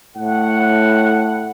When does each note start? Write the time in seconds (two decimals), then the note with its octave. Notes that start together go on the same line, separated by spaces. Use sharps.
0.16 A2 F#5